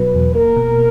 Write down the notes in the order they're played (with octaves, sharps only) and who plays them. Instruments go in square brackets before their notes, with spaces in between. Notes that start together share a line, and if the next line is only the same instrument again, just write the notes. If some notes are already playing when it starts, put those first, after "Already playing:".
Already playing: [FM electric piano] B2 F#3 [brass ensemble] B4
[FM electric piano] E2
[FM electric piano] A#3 [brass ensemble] A#4
[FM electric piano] B2